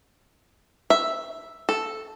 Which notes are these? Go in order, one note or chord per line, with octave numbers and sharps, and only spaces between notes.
E5
A4